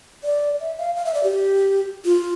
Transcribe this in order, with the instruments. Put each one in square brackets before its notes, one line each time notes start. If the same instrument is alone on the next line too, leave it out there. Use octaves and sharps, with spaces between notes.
[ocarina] D5
E5
F5
F5
E5
D5
G4
F4